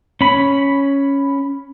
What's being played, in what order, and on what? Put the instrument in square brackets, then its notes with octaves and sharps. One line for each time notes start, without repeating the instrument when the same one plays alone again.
[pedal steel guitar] C#4 B5